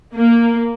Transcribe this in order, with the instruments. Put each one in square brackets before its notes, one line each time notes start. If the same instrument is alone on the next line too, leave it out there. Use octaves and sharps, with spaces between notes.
[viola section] A#3